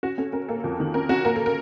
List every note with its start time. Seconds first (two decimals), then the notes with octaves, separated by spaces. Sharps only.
0.03 C#4 F#4
0.18 C#4 A4
0.33 C#4 A#4
0.49 A#3 A4
0.64 F2
0.80 D#3
0.94 C#4 A#4
1.09 C#4 F#4
1.25 A#3 A#4
1.36 A4
1.46 A#4